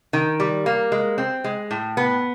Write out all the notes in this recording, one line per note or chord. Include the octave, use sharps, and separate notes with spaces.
D#3
G3
A#3
G#3
C4
G#3
A2
B3